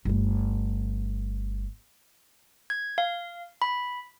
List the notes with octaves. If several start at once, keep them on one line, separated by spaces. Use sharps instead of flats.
G1 A3
G#6
F5
B5